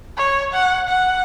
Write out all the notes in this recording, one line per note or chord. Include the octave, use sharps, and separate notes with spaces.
C#5
F#5
F#5